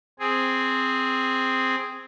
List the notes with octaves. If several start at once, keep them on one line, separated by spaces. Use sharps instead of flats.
C4 G#4